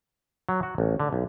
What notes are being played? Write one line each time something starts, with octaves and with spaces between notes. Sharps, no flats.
F#3
F#4
A1
D3
B1